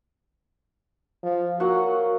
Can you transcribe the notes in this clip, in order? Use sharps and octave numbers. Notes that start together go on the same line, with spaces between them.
F3
F#3 A#3 F#4 F#5